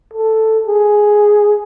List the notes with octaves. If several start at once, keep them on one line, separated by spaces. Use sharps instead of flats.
A4
G#4